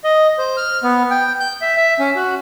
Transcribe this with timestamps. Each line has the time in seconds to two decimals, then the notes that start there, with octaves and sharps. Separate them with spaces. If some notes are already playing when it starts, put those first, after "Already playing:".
0.04 D#5
0.38 C5
0.57 F6
0.83 B3
1.11 G5
1.40 G6
1.62 E5
1.77 E5
1.99 C#4
2.15 F#4